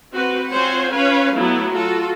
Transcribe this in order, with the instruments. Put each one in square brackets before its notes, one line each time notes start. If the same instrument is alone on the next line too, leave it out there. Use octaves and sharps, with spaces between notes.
[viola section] C4 F#4 B4
C4 F4 C5 C#5 F#5 G#5
C#4 B4 C#5 F5
F#3 A3 B3 E4
F4 F#4 A4